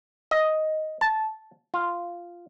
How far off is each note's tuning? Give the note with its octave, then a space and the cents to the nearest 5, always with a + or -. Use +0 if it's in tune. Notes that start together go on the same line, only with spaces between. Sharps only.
D#5 +5
A5 -10
F4 -5